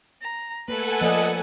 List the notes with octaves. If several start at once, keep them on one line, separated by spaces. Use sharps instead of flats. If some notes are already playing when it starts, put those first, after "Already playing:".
A#5
A3 A#3 A4 B4 F#5 G#5
F3 A#3 D5 D#5